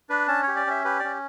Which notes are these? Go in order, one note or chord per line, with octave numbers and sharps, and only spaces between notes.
D4 B4
C#4 A5
C#5
G4
D5
C#4 E5
G4 B4
C#4 D5